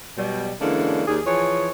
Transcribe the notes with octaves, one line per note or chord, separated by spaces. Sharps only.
B2 F#3 G3
D3 E3 G#3 A#3 C#4 D4
D#2 G#4 D5
E3 F3 G#4 C#5